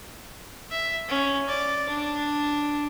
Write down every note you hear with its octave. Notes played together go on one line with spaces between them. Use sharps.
E5
C#4
D5
D4